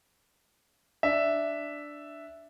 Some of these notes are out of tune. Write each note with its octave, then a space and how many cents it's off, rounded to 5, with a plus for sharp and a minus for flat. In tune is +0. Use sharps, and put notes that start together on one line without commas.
D4 +0 E5 +0